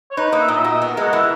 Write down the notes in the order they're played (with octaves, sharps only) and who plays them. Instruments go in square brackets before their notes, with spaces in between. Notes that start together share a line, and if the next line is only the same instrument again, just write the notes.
[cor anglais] C#5
[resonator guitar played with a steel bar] D#4 [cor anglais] B4
[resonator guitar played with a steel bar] A#3 [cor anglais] D#5
[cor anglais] E5
[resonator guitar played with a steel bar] A#2 [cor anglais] D#5
[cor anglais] E5
[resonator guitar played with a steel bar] F#4
[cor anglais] D#5
[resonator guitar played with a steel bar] B3
[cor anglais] A#4
[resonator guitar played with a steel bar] G#3
[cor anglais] F#4
[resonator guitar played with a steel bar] E3 [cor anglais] E4